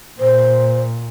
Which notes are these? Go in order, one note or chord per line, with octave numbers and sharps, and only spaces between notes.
A#2 C5